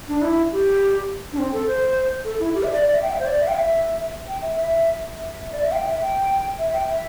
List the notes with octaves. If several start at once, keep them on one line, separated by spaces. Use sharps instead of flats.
D4
E4
G4
D4
C4
A4
C5
A4
E4
G4
E5
D5
D5
E5
G5
E5
C5
D5
E5
G5
E5
G5
E5
E5
E5
D5
E5
G5
E5
G5
E5
G5
E5